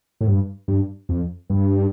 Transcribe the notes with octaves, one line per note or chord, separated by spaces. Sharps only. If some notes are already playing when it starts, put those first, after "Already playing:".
A2
G2
G2
F2
G2